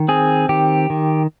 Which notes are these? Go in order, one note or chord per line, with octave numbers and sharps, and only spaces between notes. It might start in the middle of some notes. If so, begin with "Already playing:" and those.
Already playing: D#3
C4 G#4
D#3 G4
D#3